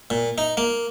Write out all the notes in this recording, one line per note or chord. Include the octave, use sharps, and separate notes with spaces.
A#2
D#4
A#3